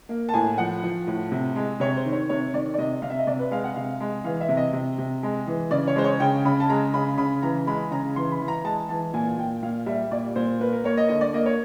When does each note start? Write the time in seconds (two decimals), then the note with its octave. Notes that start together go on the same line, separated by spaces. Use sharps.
0.09 A#3
0.29 A5
0.34 A2 G#5
0.58 F3 F#5
0.83 F3
1.07 A2
1.32 C3
1.56 G#3
1.80 C3 C#5
1.97 C5
2.05 D#3
2.12 C#5
2.29 C3 C#5
2.54 D#3 D5
2.74 D5
2.78 C3 D#5
3.02 C3 F5
3.10 E5
3.19 D#5
3.27 C3 D5
3.39 B4
3.51 G#3 F5
3.64 F#5
3.76 C3 F5
4.01 G#3
4.24 E3 F5
4.41 E5
4.49 C3
4.57 D#5
4.73 C3
4.98 C3
5.23 G#3
5.47 E3
5.71 C#3 D5
5.87 C#5
5.96 G#3 C5
6.04 C#5
6.20 C#3 G5
6.45 C#3 B5
6.60 A5
6.69 G#3 A#5
6.93 C#3 B5
7.18 C#3 B5
7.42 E3 A#5
7.67 G#3 B5
7.91 C#3 A#5
8.16 E3 C6
8.32 B5
8.40 E3
8.48 A#5
8.64 G#3 A5
8.89 E3 A5
9.13 A#2 G#5
9.37 A#2 G5
9.62 A#2 F5
9.86 G3 E5
10.11 A#2 D5
10.36 A#2 C5
10.60 A#3 B4
10.73 A#4
10.84 A#3 C#5
10.97 D#5
11.09 D3 D#5
11.21 D5
11.34 A#3 D#5
11.46 C#5